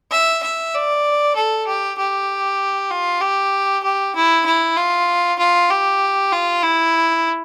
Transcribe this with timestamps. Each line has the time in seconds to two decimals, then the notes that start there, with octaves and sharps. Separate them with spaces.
0.12 E5
0.43 E5
0.75 D5
1.36 A4
1.67 G4
1.98 G4
2.91 F4
3.21 G4
3.83 G4
4.16 E4
4.46 E4
4.77 F4
5.39 F4
5.70 G4
6.33 F4
6.63 E4